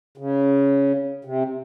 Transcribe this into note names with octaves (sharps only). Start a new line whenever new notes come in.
C#3
C3